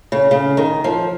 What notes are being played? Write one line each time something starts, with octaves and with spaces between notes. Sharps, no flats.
C#3
C#3
D#3
F3